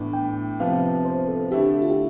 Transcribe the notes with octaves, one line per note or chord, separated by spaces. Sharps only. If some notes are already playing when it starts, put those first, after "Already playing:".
Already playing: A2 E3 B3 D4
G5
C3 F3 B3 F5
C5
A4
D3 A3 E4 G4
F4
G4